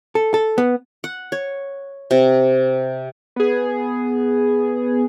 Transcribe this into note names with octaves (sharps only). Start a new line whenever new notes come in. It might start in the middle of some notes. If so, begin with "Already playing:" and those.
A4
A4
B3
F#5
C#5
C3
B3 G#4